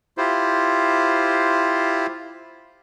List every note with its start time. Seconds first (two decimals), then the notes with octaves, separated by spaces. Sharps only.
0.18 E4 F4 G4 C5